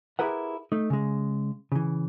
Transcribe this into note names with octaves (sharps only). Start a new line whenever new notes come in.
E4 G4 G#4 A#4 B4 F#5
A3 D#4
C#3 G#3
C#3 E3